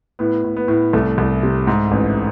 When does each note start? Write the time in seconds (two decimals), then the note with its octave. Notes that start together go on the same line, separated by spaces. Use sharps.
0.19 A2 B3
0.44 A2
0.56 B3
0.68 A2
0.93 C2 A3
1.18 C2
1.43 C3
1.67 G#2
1.91 A1